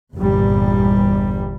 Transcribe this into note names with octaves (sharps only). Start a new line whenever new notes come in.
G1 E2 A#2 G3